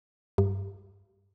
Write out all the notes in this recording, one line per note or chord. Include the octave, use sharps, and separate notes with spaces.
G2